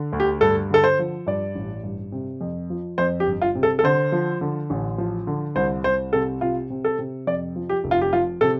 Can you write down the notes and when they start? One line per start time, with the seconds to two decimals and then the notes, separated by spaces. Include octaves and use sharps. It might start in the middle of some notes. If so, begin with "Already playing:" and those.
Already playing: D3
0.13 D2
0.20 G4
0.41 G2 A4
0.71 D3 A4
0.84 C5
0.99 F3
1.26 G2 D5
1.55 A1
1.84 G2
2.12 C3
2.41 F2
2.70 F3
2.98 F2 C5
3.20 G4
3.27 G1
3.42 F4
3.55 C3
3.63 A4
3.79 A4
3.84 D3 C5
4.12 F3
4.41 D3
4.70 A1
4.98 F3
5.27 D3
5.55 C2 C5
5.84 C2 C5
6.13 C3 A4
6.41 C3 F4
6.70 C3
6.85 A4
6.99 C3
7.27 F2 D5
7.56 F3
7.69 G4
7.84 F1
7.91 F4
8.01 G4
8.13 F3 F4
8.41 C3 A4